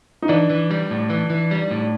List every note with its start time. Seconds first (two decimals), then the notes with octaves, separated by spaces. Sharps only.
0.22 D#4
0.29 E3 D4
0.50 E3
0.71 G3
0.91 A2
1.10 E3
1.30 E3
1.51 G3
1.71 A2